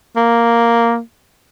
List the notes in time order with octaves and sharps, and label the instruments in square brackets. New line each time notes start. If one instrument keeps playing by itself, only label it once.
[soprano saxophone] A#3